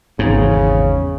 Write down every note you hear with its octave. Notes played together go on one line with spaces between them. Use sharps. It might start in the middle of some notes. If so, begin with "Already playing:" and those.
G#1 E2 G#2 C#3